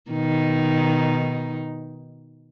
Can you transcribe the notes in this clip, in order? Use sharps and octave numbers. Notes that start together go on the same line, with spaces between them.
B2 D#3 D#4